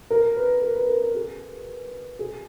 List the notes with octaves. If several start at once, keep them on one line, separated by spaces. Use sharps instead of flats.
A#4
B4
A#4
B4
A#4
A#4
G#4
G#4